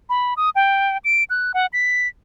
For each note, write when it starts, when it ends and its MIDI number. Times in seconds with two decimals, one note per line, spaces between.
0.10 0.34 83
0.37 0.50 87
0.56 0.97 79
1.05 1.24 98
1.30 1.52 90
1.54 1.66 78
1.73 2.08 95